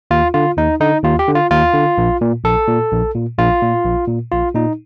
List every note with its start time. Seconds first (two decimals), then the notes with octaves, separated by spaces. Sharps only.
0.11 D#2 F4
0.34 D3 F4
0.57 D#2 D#4
0.80 D3 D#4
1.04 D#2 F4
1.19 G4
1.28 D3
1.35 F4
1.51 D#2 F4
1.74 D3
1.98 A#1
2.21 A#2
2.44 A#1 A4
2.67 A#2
2.91 A#1
3.15 A#2
3.38 A#1 F4
3.62 A#2
3.84 A#1
4.08 A#2
4.32 A#1 F4
4.55 A#2 D#4